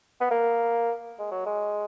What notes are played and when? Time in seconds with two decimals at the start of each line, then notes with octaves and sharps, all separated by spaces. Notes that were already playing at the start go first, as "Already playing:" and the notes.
0.21 B3
0.31 A#3
1.19 G#3
1.31 F#3
1.46 G#3